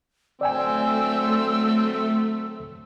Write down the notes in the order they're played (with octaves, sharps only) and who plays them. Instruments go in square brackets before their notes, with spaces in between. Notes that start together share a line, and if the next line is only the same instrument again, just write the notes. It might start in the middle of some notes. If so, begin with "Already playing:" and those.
[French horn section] D3 F#3 C4 [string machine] A3 [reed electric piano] D5 G5 G#5 [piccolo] E6